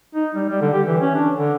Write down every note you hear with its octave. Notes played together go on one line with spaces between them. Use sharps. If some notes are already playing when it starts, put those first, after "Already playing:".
D#4
G3
G3
D3
G4
E3
C#4
D4
D3